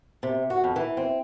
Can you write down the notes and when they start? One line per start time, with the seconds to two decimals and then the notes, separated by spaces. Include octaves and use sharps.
0.23 C3
0.50 F#4
0.64 F2
0.76 E3
0.97 C4